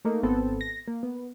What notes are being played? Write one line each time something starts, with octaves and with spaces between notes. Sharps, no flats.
A3 A#3 D#4
G#1 B3 C4 A4
A#6
A#3
B3